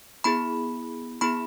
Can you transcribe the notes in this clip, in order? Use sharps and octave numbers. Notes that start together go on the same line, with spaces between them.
B3 E4 G#4 B5
B3 E4 G#4 B5